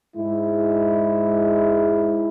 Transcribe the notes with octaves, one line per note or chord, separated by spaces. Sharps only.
G#2 G#3 E4